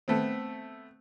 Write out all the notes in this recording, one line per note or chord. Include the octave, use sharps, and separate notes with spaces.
A3 B3 C4